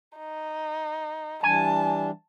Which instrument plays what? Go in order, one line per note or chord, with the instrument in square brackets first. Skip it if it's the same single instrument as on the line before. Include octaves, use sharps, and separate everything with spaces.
[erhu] D#4
[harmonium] E3 G3 D4 [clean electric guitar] G#5 [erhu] A5